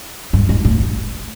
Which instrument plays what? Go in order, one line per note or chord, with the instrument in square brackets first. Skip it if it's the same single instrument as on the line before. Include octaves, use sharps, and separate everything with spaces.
[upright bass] G2
G#2
A2